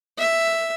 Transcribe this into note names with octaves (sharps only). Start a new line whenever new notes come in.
E5